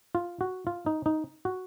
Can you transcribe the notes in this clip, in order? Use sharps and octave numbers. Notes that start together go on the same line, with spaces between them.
F4
F#4
F4
D#4
D#4
F#4